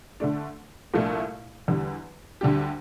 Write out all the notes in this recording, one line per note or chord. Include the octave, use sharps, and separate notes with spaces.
D3 A3 D4
C2 A#2 F3 A3 D4
E2 D3 G3
D2 D3 G3 D4 G4